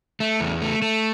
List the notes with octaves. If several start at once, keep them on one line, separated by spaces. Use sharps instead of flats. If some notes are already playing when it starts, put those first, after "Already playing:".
A3
E2
A3
A3